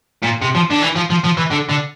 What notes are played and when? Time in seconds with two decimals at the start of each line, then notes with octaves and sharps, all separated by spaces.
0.23 A#2
0.41 C3
0.55 F3
0.71 D3
0.82 E3
0.96 F3
1.10 F3
1.24 F3
1.37 E3
1.51 D3
1.70 D3